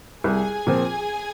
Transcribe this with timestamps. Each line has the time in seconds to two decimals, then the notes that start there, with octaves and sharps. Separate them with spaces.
0.24 C2 G#4 G#5
0.67 A#2 F3 C4